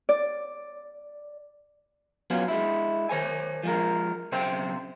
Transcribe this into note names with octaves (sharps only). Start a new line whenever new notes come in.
D5
F#3 B3 C#4 F4
G#3 E4
D#3 C5 C#5 G#5
F3 G#3 A#4
B1 C#3 C4 C5 G5